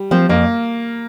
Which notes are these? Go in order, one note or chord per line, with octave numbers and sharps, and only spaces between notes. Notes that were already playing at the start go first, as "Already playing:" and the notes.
Already playing: G3
F3 C4
F2 A#3